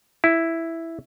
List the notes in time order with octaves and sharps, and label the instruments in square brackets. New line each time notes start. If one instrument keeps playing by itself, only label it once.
[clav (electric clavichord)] E4